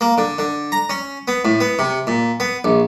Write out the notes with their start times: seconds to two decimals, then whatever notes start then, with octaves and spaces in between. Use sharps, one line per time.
0.01 A#3
0.18 D3
0.39 D3
0.72 A#5
0.90 C#4
1.28 B3
1.45 A2
1.61 B3
1.79 C3
2.07 A#2
2.40 B3
2.64 A#1